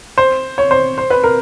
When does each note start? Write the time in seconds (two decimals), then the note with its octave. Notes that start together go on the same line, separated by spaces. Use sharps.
0.18 C5
0.58 C#5
0.71 C5
0.98 C5
1.10 B4
1.24 A#4